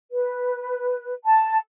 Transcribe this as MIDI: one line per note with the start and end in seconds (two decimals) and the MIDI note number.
0.11 1.14 71
1.26 1.57 81